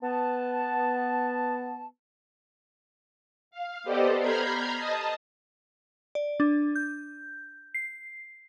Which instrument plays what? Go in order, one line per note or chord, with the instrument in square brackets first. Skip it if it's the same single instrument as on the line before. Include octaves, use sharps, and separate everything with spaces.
[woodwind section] B3 A5
[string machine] F5
B3 G4 A4 C5 D5 D#5
A#5 B5 F6 G6 G#6 C7
D#5 A5 D#6
[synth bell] D5
D4
G6
C7